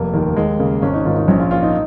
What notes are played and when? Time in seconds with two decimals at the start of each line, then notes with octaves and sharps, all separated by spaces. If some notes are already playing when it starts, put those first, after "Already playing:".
Already playing: F1 A#3
0.13 D#2 D#3 A#3
0.36 D#2 G#3
0.59 C#3 A#3
0.82 G#1 C#4
0.94 D#4
1.05 G#2 D#3 F4
1.16 D#4
1.28 A#1 C#4
1.39 F4
1.51 A#2 F4
1.62 D#4